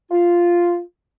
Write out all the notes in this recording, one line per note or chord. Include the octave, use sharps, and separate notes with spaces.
F4